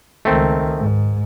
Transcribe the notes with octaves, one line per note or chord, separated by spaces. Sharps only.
C#2 D#3 A3 C4
G#2